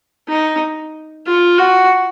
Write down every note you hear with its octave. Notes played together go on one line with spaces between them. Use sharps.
D#4
F4
F#4